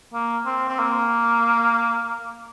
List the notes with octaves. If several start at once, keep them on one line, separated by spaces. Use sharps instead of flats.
A#3
C4
C4
A#3